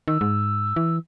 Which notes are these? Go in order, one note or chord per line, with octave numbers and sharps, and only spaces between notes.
D#3 E6
G#2
E3